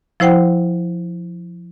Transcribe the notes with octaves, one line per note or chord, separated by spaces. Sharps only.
F3 E4 C5 F#5 G5